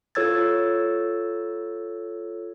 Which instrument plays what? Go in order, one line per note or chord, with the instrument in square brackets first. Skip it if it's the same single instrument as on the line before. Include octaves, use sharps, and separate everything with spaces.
[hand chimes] F4 A4 C#5 E6 G#6 A6